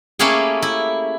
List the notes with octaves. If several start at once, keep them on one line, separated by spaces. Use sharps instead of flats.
A3 A#3 C#4 E4 G4 G#4
E4